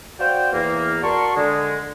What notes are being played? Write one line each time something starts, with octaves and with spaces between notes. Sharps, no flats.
F#4 C5 D5 F5 G5
E2 A#3
F#4 A#4 D5 A5 C6 C#6
D3 G#3